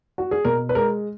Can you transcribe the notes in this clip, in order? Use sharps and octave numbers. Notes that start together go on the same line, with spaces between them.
F#4
G#4
B2 A#4
B4
G#3 A#4